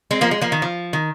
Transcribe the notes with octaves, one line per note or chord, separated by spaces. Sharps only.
G#3 C4
F3 A#3
G#3
F3 A#3
D#3
F3
D#3